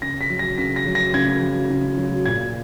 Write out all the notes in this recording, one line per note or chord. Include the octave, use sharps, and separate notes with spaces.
C#3 A#6
B6
F#3
A#6
C#3 B6
A#6
F#3
A#6
C#3 G#6
F#3
C#3
F#3
A#2 G#6